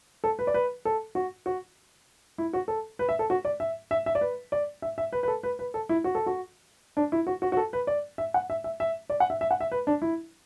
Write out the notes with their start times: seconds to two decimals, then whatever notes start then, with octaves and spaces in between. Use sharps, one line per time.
0.24 A4
0.39 B4
0.47 D5
0.54 B4
0.85 A4
1.15 F#4
1.46 F#4
2.38 E4
2.53 F#4
2.68 A4
2.99 B4
3.09 E5
3.19 A4
3.30 F#4
3.45 D5
3.60 E5
3.91 E5
4.06 E5
4.15 D5
4.21 B4
4.52 D5
4.82 E5
4.98 E5
5.13 B4
5.23 B4
5.28 A4
5.43 B4
5.59 B4
5.74 A4
5.89 E4
6.04 F#4
6.15 A4
6.26 F#4
6.97 D4
7.12 E4
7.27 F#4
7.42 F#4
7.52 F#4
7.57 A4
7.73 B4
7.87 D5
8.18 E5
8.34 F#5
8.50 E5
8.64 E5
8.80 E5
9.10 D5
9.20 F#5
9.30 E5
9.41 E5
9.51 F#5
9.61 E5
9.72 B4
9.87 D4
10.02 E4